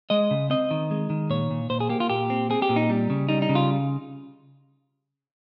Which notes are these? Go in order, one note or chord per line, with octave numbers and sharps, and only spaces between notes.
G#3 D#5
C#3
C4 D#5
D#3
G#3
D#3
A#2 C#5
A#2
A#2 C5
G#4
A#3 G4
F4
A#2 G4
C4
C4 G#4
G4
A#2
D#4
G3
C#3
G3 D#4
D#4
C#3
F4